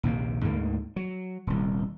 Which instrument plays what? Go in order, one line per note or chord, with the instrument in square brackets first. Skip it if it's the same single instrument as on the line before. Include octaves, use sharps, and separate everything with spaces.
[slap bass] A#1 D#2 C3 A#3
D2 G#2 D3 A#3
F#3
D#1 C2